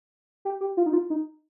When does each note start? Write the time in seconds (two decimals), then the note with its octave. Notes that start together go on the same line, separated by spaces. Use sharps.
0.45 G4
0.61 G4
0.77 F4
0.86 D#4
0.93 F4
1.10 D#4